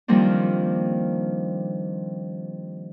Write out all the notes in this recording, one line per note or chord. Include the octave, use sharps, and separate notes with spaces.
D#3 F3 G3 A#3 C4 D4